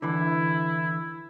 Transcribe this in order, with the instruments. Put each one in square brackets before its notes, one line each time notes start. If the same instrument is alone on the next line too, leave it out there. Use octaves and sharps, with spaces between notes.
[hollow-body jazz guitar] D3 E3 [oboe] E4